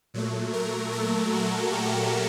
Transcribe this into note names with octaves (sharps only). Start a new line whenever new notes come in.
A#2 F#3 A3
A#4
A4
F#4
G4